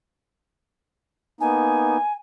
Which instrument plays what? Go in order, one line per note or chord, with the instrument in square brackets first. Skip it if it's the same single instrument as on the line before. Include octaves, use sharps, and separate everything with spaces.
[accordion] A#3 B3 D#4 [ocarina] G#5